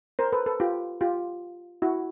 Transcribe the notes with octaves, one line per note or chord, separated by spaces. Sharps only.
A#4 C5
A4 B4
A4 B4
F4 G4
F4 G4
E4 F#4